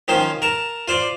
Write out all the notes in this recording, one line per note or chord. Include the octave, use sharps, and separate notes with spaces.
D#3 F3 C#4 C5
A#4 A5
F4 C5 D5